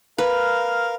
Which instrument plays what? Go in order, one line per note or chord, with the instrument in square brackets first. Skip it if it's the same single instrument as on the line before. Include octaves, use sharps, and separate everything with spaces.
[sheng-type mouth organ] A#4 F5 [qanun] B4